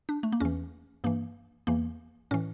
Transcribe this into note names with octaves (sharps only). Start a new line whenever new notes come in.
D4
A3
A#3
E2 E3 C#4
G2 E3 A#3
E2 E3 A#3
A2 E3 C#4